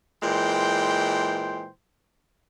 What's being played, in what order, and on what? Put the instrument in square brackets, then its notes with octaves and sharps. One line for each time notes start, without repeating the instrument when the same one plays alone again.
[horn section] A#2 E3 G#3 C5 G5